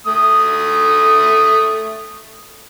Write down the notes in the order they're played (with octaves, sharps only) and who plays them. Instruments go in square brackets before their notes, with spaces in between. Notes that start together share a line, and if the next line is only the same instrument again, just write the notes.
[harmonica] A3 D#6